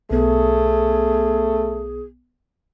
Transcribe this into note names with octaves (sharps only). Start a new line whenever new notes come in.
B1 A3 B3 G#4